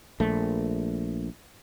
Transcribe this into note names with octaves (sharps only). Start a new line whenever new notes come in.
A#1 A3